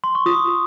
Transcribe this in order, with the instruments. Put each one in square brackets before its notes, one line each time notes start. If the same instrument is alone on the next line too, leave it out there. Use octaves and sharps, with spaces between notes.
[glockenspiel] C6
C#6
[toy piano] F4 [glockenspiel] D#6